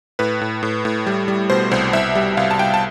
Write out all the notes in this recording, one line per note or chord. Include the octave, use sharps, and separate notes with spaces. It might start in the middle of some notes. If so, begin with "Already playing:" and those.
A2 B4
A2
A2
A2
G3
G3
B2 C5
C2 C5
C2 E5
G3
C2 F5
A5
C2 G5
A5